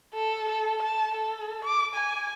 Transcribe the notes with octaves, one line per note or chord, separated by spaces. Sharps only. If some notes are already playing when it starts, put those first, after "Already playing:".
A4
A4
A5
A4
D6
G#5